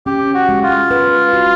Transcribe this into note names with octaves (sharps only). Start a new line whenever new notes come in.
C#4 G4
F#4
G#3
F4
B4
F#4